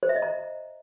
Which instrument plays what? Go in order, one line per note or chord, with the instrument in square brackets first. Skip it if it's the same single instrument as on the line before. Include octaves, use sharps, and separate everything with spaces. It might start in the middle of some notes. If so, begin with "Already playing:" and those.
[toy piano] C5
E5
D#5
A#5